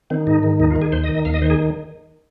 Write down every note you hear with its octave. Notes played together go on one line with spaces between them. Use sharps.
D#3 C4
G#2 D#4
D#3
D#2 D#4
F4
D#3
G#4
D#2 C5
D#5
D#3
D#5
D#2 F5
D#5
D#3 C5
G#4